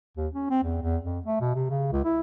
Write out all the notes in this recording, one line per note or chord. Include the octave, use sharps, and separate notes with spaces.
D#2
C#4
C4
E2
E2
F2
A3
B2
C3
C#3
C#2
E4